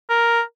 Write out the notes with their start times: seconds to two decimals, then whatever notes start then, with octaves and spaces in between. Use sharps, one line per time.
0.10 A#4